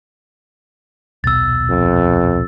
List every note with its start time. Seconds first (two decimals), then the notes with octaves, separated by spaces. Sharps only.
1.24 D#1 B1 B2 E6 A6
1.70 F2